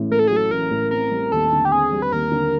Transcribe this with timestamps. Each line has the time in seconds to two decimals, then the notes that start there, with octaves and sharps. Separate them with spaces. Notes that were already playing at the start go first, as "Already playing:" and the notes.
Already playing: A1 A2 A3
0.10 A3 A#4
0.19 A4
0.27 G#4
0.31 F#3
0.36 A4
0.51 A1 A#4
0.71 A2
0.91 C4 A#4
1.11 G3
1.32 D#2 A4
1.52 D3
1.65 G4
1.72 C4 G#4
1.92 G3
2.02 B4
2.12 D#2 A#4
2.32 D3